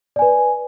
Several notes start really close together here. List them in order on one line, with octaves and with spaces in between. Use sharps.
D5 G#5 B4